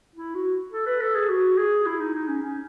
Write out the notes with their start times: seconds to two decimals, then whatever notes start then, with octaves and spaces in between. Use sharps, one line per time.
0.16 E4
0.35 F#4
0.72 A4
0.87 B4
1.01 A4
1.15 G#4
1.29 F#4
1.58 G#4
1.86 E4
2.00 D#4
2.14 D#4
2.28 C#4
2.43 C#4